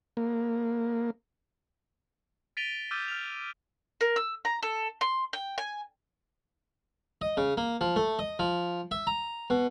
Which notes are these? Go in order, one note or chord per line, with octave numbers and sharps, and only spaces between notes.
A#3
A6 B6 D7 D#7 F7 G7
D6 E6 F6 G6 A6 D#7
F6 F7
A#4
E6
A#5
A4
C6
G5
G#5
D#5
C#3
A#3
F3
A3
D#5
F3
E5
A#5
B2